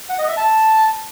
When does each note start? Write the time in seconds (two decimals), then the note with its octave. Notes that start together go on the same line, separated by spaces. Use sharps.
0.09 F#5
0.19 D#5
0.28 E5
0.37 A5